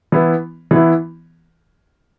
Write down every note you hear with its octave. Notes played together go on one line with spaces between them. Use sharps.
E3 B3 E4
E3 B3 E4